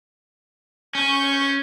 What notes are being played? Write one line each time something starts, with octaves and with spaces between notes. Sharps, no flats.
C#4 C#6 G6